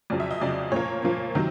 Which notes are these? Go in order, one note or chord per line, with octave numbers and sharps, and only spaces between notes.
F2 C#3 F#3 D5
E5
D#5
F2 C#3 F#3 D5
A#2 F3 A#3 C#5
A#2 F3 A#3
C3 D#3 F#3